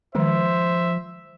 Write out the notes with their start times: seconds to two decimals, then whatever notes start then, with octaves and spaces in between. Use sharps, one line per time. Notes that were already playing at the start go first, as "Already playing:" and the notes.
0.15 D#3 F3 G#3 C5 E5